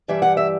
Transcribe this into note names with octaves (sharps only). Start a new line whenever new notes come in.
G2 E3 G3 E5
F#5
E5